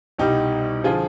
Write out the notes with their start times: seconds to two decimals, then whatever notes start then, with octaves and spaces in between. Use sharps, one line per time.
0.18 C2 B2 G3 D#4 G4
0.84 D3 F3 F4 G#4